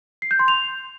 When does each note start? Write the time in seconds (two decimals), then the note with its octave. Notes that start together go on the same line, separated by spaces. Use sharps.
0.22 C7
0.31 G6
0.39 C6
0.48 F7